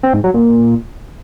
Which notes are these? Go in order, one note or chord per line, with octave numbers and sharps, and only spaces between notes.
C4
G#2
F#3
A#2